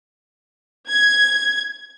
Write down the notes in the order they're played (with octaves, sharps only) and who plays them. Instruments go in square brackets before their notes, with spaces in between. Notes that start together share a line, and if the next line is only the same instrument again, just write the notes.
[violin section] G#6